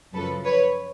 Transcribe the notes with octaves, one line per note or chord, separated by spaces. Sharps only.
F#2 C#3 F3 A4 B4
B4 C#5